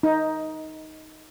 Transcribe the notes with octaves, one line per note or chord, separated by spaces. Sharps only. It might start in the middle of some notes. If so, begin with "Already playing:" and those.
D#4